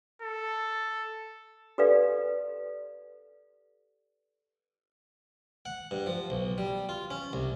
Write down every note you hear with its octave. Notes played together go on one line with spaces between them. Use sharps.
A4
G4 A4 B4 D5 F5
F#5
G2
F3
B1
G3
F4
C#4
C2